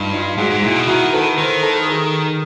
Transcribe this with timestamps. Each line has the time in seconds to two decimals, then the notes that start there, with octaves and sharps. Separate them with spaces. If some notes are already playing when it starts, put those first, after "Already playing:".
Already playing: G2 D#4 F4
0.13 D#4 F4
0.38 G#2 F#4 G#4
0.50 G#2
0.63 A#2 E4 F#4
0.76 B2
0.88 D#3 E4 F#4
1.13 A4 B4
1.38 D#3 A#4 C5
1.63 A4 B4
1.87 G#4 A#4
2.27 A#4